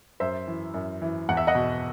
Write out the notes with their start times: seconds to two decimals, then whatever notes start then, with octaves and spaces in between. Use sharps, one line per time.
0.20 F#2 C5 E5
0.48 E3
0.74 F#2
1.02 E3
1.29 E2 F#5
1.37 E5
1.47 D#5 F#5
1.55 B2